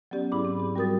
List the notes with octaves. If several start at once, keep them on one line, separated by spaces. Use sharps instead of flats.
F#3 B3 C#4 G4 D5
G#2 E4 G#4 B5 D6
C4
G4
G3 F#4 G4 A#4 D#6 A6